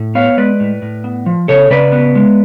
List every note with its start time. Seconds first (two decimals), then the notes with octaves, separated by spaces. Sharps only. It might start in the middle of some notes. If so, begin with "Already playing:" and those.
Already playing: A2
0.15 B3 C#5 F5
0.37 G#3 B4 D5
0.60 A2
0.82 A2
1.04 B3
1.26 F3
1.48 C#3 A4 C#5
1.71 C#3 B4 D5
1.92 B3
2.15 G#3